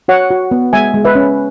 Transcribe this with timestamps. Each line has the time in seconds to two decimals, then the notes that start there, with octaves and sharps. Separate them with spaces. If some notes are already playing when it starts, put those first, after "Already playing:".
0.08 F#4 C#5 F#5
0.30 F#4
0.51 B3
0.73 G#3 E5 G#5
0.94 G#3
1.05 B4 E5
1.15 C#4